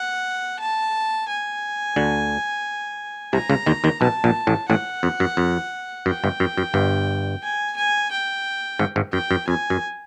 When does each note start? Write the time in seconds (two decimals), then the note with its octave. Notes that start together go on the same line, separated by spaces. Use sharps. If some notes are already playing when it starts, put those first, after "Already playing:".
Already playing: F#5
0.59 A5
1.28 G#5
1.96 D2 D3
3.33 C2 C3 A#5
3.50 C#2 C#3
3.66 D#2 D#3
3.84 D#2 D#3
4.01 B1 B2 A5
4.24 A#1 A#2
4.47 A1 A2
4.69 A1 A2 F#5
5.03 F2
5.20 F#2
5.37 F2
6.06 F#2 G5
6.24 G1 G2
6.40 F#2
6.58 F#2
6.74 G1 G2
7.43 G#5
7.77 G#5
8.12 G5
8.79 G#1 G#2
8.96 G#1 G#2
9.13 F#2 G5
9.31 F#2
9.48 F2 G#5
9.70 F#2